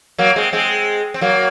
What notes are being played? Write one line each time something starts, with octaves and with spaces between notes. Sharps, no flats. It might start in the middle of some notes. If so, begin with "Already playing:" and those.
F#3 A#3
G#3 C4
G#3 C4
C4
F#3 A#3